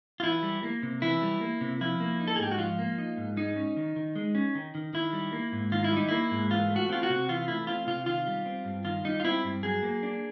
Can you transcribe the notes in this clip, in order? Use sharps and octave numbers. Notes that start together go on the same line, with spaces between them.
F4
E3 E4
G3
A#3
C3
E3 E4
G3
A#3
C3
F3 E4
A#3
D#4
A4
G#4
G#2 G4
F#4
F3 F4
A#3
D#4
G#2
G#3 D#4
C#4
D#3
D#3
G#3
C#4
D#3
D#3
D#3 E4
G3
A#3
G#2
D#3 F4
E4
G3
D#4
A#3 E4
G#2
E3 F4
A3
F#4
C4 F4
F#4
C3
E3 F4
A3 E4
C4 F4
C3 F4
D#3 F4
G3
C4
G2
D#3 F4
G3 D#4
F4
C4 E4
G2
F#3 G#4
A#3
D4